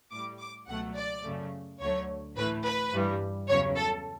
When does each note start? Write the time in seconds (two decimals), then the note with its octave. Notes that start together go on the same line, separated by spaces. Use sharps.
0.11 A2 G3 D6
0.40 D6
0.68 C#2 B2 F#3 A3 F#5
0.96 D5
1.24 F#2 C#3 F#3 A3
1.80 D2 D3 F#3 A3 C#5
2.37 A2 E3 A3 B4
2.65 B4
2.93 G2 E3 G3
3.49 E2 C#3 F#3 C#5
3.77 A4